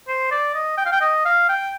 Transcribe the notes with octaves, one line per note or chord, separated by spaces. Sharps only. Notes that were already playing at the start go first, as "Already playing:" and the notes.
C5
D5
D#5
G5
F5
G5
D#5
F5
G5